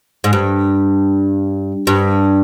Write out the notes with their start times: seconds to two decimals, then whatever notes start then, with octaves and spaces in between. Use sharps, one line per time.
0.24 G#2
0.33 G2
1.87 G2